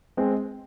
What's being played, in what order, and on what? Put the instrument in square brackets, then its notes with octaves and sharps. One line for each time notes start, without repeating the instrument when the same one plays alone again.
[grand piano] G#3 C4